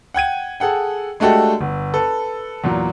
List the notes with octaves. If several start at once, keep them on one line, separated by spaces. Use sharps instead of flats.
F#5 G5 G#6 D#7
G#4 A4 F#5 G5
G#3 A3 D4 F#4 G4 A4
G1
A4 B4
E2 A#2 F#3